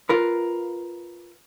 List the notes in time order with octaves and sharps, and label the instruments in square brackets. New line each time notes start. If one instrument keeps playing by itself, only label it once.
[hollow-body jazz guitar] F4 A#4 B4